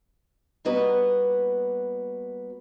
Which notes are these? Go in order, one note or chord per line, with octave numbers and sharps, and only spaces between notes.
G3 A#3 B3 F#4 B4 D#5